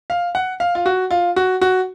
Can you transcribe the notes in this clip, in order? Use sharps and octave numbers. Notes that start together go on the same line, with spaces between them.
F5
F#5
F5
F4
F#4
F4
F#4
F#4